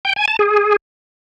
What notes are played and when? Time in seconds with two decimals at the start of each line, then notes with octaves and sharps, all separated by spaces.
0.05 G5
0.16 G#5
0.28 A5
0.39 G#4